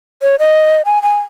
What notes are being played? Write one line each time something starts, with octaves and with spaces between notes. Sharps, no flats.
C#5
D#5
G#5
G#5